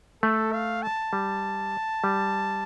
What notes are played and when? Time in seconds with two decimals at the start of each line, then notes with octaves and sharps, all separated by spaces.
0.23 A3 A4
0.53 F5
0.83 A5
1.13 G3
2.04 G3